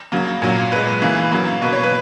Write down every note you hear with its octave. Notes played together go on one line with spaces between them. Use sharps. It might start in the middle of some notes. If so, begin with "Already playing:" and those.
C#3 F#3 A#3
A#2 F#3 A#3
A#2 G#3 B4
C#3 E3 A#3
C#3 F#3 A#3
B2 A#3 B4
C#5
B4